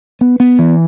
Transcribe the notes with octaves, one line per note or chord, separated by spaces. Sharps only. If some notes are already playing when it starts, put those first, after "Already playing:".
B3
B3
E3